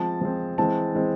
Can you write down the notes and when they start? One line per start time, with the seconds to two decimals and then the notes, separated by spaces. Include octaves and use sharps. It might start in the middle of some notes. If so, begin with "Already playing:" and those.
Already playing: F3 G#3 C4 A5
0.21 F3 G#3 C4
0.58 E3 G#3 C4 A5
0.95 E3 G#3 C4